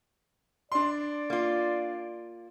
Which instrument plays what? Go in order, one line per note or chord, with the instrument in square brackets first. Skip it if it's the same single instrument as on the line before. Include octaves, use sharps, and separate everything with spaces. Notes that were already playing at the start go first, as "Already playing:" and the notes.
[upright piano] D4 C6 [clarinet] D5
[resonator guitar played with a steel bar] A#3 F4